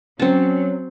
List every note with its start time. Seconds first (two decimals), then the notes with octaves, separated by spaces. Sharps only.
0.20 F#3 C4 C#4 A5